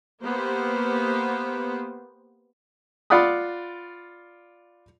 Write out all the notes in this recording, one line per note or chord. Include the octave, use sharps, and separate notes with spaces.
A#3 B3 G4 C5
F4 D5 F#5 B5 D#6